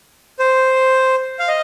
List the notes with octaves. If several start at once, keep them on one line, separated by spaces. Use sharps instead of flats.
C5
F5
D#5